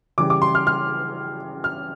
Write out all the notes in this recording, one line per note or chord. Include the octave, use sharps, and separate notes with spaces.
C#3 E3 G3 D6
D6
C6
F6
F6
F6